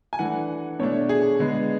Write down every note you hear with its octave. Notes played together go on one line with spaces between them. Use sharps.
G#5
E3 A3 D4 F#5
B2 A3 D4 C#5
G#4
D3 G#3 B3